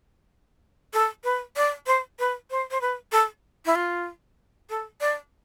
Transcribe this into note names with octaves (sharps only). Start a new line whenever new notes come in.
A4
B4
D5
C5
B4
C5
C5
B4
A4
E4
F4
A4
D5